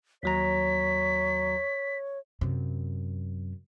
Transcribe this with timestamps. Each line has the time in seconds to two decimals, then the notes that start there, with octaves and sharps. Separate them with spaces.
0.23 D#2 F#3 C#5 A#5 B6
2.41 F#2 C3